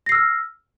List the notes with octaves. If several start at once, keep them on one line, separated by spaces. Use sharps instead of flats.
E6 F6 A#6 C7